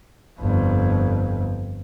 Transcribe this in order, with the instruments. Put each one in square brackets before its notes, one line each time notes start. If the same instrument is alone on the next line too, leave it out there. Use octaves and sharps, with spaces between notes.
[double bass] G1 F2